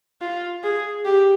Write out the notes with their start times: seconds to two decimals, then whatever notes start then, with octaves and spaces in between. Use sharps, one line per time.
0.21 F4
0.64 G#4
1.05 G4